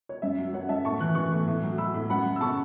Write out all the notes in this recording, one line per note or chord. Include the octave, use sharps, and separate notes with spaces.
C#5
F#2 E5
F#3
F#3 C#5 F#5
F#2 E5 A5
A2 A5 C#6
E3 F#6
E3 C#6 F#6
A2
A2
F#3
F#3 B5 E6
A2
F#2 F#5 B5
F#2
E6
C#3 A5 C#6